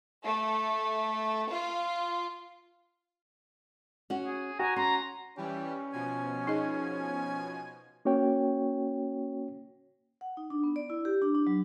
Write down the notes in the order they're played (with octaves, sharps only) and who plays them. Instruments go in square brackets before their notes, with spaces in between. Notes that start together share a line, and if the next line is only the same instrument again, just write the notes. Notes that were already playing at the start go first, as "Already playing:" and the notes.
[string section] A3
F4
[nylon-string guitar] C#4 F#4
[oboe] G#4
[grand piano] F#4 [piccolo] G#5 [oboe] A#5
[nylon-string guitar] C#4 [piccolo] A#5 [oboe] C6
[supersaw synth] E3 G3 [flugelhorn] C#4 [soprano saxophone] G4
[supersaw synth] B2 F3 [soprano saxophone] G#5
[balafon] D#4 G#4 D#5
[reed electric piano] A#3 C#4 F#4 C#5 G5
[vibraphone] F#5
D#4
D4
B3
D5
E4
G4
D4
D4
F#3